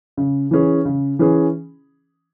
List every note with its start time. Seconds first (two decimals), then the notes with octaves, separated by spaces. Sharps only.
0.17 C#3
0.51 E3 C#4 G#4
0.85 C#3
1.19 E3 C#4 G#4